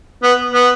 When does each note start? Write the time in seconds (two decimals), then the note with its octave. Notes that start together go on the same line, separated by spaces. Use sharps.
0.23 B3
0.52 B3